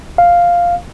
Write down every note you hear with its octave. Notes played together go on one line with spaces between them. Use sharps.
F5